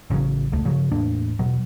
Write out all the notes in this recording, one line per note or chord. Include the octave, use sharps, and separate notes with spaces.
A1 C#3 E3 F#3
E1 C#2 A3
G2 C#3 F3 F#3
E2 A2 A#3 D4
E1 B2 F#3